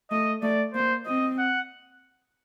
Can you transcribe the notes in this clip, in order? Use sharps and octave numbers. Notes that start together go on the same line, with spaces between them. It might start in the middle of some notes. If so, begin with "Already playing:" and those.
A3 D#5
A3 D5
A#3 C5
C4 D#5
F#5